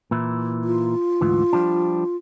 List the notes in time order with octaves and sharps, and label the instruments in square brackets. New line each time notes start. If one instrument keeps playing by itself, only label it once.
[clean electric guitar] A#2 E3 E4
[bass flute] F4
[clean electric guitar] D2 G#2 E3
F3 G3 D4